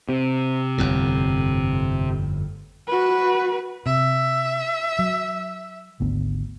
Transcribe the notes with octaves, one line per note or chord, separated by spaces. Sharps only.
C3
G1 F2 A2
F#4 B4
C3 E5
F#3
G#1 D2 B3